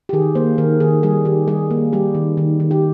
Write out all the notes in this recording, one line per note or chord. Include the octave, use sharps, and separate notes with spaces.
G4
D#3 G#4
A#3 C5
D#3 A#4
D#3 G#4
G3 G#4
D#3 G4
G3 G#4
A#3
G3 G4
D#3
D#3
D#3
G4